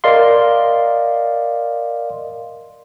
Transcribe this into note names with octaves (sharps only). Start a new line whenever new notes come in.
A#4 D5 D#5 F5 C6